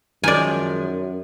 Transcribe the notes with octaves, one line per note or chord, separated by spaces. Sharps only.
F#2 D#3 F3 G#3 D5 G#5